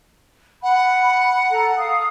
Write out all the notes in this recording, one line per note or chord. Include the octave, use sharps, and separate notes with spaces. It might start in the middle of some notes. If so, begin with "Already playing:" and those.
F#5 B5
A4 A#5
F5 D#6